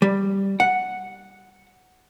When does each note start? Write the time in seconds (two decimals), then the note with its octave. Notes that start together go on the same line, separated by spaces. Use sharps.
0.02 G3
0.60 F#5